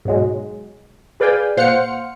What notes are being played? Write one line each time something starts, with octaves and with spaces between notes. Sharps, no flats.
G#2 B2 F#3 G#3
G#4 B4 D5 F5 G5 G#5
A#2 C5 F5 F#5 F6 C#7